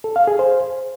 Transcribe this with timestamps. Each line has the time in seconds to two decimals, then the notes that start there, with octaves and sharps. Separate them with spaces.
0.04 A4
0.16 F5
0.27 G#4
0.39 C5